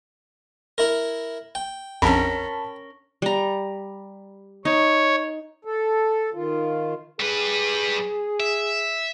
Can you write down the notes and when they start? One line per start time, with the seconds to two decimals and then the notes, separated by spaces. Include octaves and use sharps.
0.78 E4 A#4
1.55 G5
2.02 A#1 F2 C#4 A#4 A5 B5
3.22 G3 A#5
4.65 D#4 C#5
5.65 A4
6.34 D#3 F4
7.20 G3 G#4 B4
8.40 E5